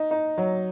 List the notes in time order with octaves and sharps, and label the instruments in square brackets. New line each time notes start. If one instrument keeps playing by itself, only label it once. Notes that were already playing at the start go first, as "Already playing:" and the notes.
Already playing: [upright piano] D#4
D#4
F#3